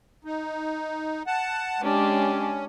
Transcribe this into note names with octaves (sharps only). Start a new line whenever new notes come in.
D#4
F#5 A5
G#3 C#4 D4 G4